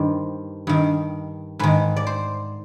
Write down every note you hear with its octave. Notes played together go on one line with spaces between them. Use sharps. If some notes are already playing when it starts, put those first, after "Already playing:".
Already playing: G2 D#3 C5
G2 D#3
G#2 D#3 B4
D5
C5